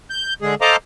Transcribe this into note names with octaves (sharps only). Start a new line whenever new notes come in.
G6
D3 G#3 G#4
A4 C5 D#5 F5 A#5 D6